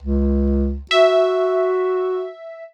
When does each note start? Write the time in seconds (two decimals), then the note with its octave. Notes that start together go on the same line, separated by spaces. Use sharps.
0.03 C#2
0.91 F#4 E5